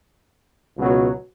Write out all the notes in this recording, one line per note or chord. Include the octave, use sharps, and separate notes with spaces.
C#2 B2 F#3